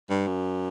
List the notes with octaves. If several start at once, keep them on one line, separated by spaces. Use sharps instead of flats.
G2
F#2